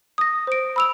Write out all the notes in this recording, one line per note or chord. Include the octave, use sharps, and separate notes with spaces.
D#6 A#6
C5 D7
B5 E6 F7